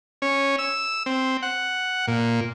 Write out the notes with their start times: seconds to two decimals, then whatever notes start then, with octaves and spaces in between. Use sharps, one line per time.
0.22 C#4
0.59 E6
1.06 C4
1.43 F#5
2.08 A#2